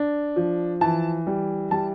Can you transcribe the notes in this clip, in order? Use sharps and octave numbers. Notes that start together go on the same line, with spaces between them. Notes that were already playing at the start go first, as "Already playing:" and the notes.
Already playing: D4
F3
E3 A5
G3
G3 A5